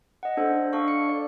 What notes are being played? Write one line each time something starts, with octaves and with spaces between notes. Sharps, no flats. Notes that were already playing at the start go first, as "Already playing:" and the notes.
D#5 F#5
D4 A4 C5
D4 A4 F5 C#6
C#7
D5